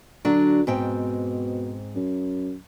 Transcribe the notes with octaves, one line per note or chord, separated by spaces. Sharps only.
D3 F#3 D4 F#4
G#2 B2 C4 G5
F#2